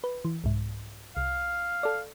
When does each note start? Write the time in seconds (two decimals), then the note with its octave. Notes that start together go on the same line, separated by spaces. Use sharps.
0.04 B4
0.25 E3
0.44 C2 G#2
1.17 C2 F5
1.83 A4 D5